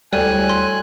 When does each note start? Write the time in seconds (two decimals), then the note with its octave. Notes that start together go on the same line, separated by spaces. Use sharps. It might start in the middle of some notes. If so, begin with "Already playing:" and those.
0.13 D2 A2 G3 D5 G#5 F#6 D#7
0.49 C6